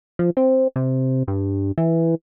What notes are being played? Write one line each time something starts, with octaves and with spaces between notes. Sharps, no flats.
F3
C4
C3
G2
E3